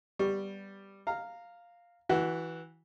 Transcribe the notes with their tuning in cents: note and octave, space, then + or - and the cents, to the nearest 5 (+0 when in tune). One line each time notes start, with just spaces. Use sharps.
G3 +0 B3 +0 C#6 +0
F5 +0 A#5 -15
E3 -15 F#4 +10